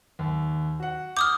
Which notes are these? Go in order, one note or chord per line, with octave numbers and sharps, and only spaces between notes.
D#2
F#4 F#5
D6 D#6 F6 G6